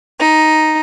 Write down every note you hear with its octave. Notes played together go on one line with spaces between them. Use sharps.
D#4